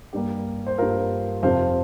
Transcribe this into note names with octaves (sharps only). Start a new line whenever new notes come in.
G2 G3 A#3 G4
C5
G2 G3 A#3 F4 A#4
F2 C3 F3 C4 C5 F5